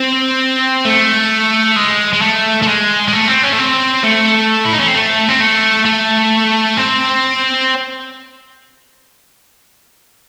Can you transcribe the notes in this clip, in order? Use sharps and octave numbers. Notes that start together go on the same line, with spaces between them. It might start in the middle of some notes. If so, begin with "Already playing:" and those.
Already playing: C4
A3
G#3
G#3
A3
A3
G#3
G#3
A3
C4
C#4
A3
C4
A3
E4
D#4
C#4
C4
A3
C4
A3
A3
C4